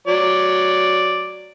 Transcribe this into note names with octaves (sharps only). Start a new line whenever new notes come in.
F#3 D5